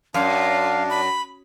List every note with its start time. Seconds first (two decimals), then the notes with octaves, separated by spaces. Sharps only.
0.14 F#2 D4 F5
0.90 B5